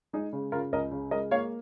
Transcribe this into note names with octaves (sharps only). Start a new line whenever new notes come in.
G#3 D#4 G#4
C#3
C#3 F4 A#4
C#2 A#4 D#5
C#3
G#3 A#4 D#5
A#3 C#5 F5